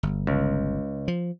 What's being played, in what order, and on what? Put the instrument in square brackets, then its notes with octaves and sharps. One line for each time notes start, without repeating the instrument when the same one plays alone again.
[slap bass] G1
[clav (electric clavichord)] C#2
[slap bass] F3